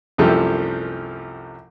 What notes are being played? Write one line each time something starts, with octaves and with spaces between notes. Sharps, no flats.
C2 F#2 F3 A3 G4 A4